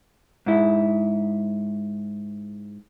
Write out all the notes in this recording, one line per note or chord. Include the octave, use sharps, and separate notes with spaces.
G#2 E4